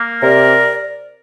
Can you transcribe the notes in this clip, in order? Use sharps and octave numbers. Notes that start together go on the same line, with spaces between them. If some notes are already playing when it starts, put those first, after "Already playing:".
Already playing: A#3
C3 A#4 D5